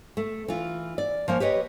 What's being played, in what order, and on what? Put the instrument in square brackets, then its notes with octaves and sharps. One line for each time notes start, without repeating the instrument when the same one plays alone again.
[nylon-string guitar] A3
E3 F4
D5
F3 A#3 C#4
G4 B4 C#5 D#5